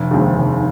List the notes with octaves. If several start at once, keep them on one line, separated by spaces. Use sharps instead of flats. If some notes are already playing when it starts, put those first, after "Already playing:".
Already playing: F1
D#2 D#3 G#3 C4
F1